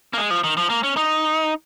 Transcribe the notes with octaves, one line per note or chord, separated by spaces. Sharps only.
A#3
G#3
F3
D#3
F3
A#3
C#4
D#4